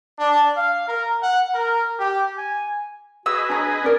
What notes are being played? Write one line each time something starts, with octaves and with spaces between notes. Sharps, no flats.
D4
F5
A#4
F#5
A#4
G4
G#5
F#4 G#4 B4 D#5 E6
D4 C#5 G#5 A#5
C#4 A#4 D5